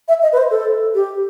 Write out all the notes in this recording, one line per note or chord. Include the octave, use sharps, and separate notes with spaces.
E5
D#5
B4
C5
A4
G4